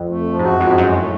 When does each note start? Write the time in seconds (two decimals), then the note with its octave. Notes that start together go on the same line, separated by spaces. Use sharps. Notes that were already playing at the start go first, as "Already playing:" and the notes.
Already playing: F2
0.09 A3
0.27 F3
0.39 G#2
0.43 F#2 F#4
0.60 F2 G#3
0.70 G#2
0.77 F#2 A2
0.94 A3